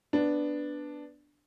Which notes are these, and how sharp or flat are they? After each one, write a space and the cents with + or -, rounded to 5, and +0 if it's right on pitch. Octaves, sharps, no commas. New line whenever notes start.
B3 +0 D4 +0